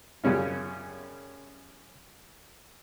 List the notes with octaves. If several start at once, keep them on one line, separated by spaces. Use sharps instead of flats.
F#2 C#3 G3 C#4 F4